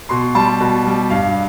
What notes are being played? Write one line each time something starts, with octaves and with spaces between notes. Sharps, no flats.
B2 C6
G3 A5
B2
G3
G2 F5